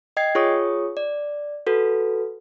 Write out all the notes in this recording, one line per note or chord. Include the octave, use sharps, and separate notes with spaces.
D#5 G5 G#6 C7
F4 G#4 C#5 C#6 D#6
D5
F#4 A4 B4